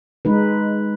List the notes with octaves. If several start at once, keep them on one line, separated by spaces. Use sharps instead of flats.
G#3 D#4 B4